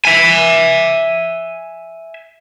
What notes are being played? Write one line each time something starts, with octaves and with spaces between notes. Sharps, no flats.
E5 G#5